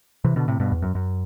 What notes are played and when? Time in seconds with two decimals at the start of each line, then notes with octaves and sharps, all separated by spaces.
0.25 C3 E3
0.36 B2 D3
0.48 A2 C3
0.60 G2 B2
0.72 E2
0.82 F#2
0.95 F#2